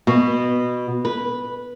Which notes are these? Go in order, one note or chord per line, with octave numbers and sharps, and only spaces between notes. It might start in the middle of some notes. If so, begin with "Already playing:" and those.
B2
B4